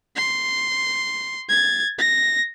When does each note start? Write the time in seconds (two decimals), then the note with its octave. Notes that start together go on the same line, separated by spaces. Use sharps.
0.16 C6
1.49 G#6 A6
1.98 A#6